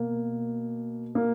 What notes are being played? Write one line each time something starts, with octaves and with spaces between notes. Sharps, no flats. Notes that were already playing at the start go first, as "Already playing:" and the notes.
Already playing: B2 A#3
A#3